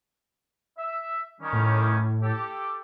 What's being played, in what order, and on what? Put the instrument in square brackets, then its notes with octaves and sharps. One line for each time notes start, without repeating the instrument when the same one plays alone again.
[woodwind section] E5
D#3 G3 C#4
[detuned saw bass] A2
[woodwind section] G4 A4